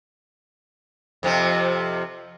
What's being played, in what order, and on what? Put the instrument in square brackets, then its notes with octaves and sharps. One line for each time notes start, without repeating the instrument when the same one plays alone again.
[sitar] F2 C3 F3